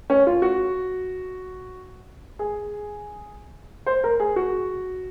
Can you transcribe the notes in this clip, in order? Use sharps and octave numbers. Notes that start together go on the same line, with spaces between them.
C#4
F4
F#4
G#4
C5
A#4
G#4
F#4